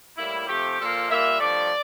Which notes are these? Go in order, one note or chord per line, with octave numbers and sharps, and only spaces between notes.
A2 G3 A#3 E4
C3 F3 A3 G4
A#2 F3 A#3 A4
A#2 G3 A#3 E5
G2 F3 A3 D5